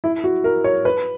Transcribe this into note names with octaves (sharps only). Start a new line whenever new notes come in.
E4
F#4
A#4
C#5
B4